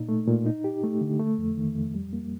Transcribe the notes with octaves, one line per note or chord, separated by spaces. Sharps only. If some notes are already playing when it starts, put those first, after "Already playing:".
Already playing: A#2 D#4
A3
A#2
D#4
G4
A3
D3
A3
F2
D#3
F2
G3
A#3